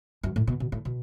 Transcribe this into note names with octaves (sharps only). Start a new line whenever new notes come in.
F#2
A2
B2
B2
A2
B2